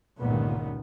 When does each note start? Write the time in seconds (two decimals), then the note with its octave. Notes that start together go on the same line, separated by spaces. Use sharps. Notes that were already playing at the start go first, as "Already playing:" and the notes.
0.19 G1 C#2 A#2 D#3 B3